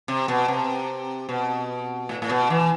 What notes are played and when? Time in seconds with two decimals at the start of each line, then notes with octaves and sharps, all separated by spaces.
0.08 C3
0.28 B2
0.48 C3
1.29 B2
2.09 A2
2.22 A2
2.29 B2
2.50 E3